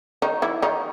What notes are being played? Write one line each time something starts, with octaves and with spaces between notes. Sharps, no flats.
D#3 D#4
E3 E4
D#3 D#4